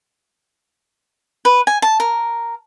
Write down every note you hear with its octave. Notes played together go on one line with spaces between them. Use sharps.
B4
G#5
A5
A#4